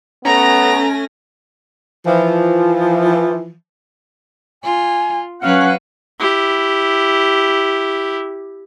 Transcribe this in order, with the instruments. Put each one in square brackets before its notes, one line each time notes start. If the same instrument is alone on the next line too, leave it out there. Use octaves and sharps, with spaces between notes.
[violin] A3 A#6 [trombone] B3 [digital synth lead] C#4 [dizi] A#5
[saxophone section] E3 F3
[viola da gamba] F4 [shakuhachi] G#5
[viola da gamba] F#3 B4 [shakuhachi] C#4 [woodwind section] F5 F#5
[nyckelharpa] E4 G4